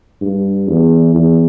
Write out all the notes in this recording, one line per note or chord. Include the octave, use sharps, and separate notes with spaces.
G2
E2
E2